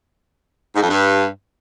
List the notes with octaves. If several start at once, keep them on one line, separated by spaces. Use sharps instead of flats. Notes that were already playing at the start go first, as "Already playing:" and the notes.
G#2
F2
G2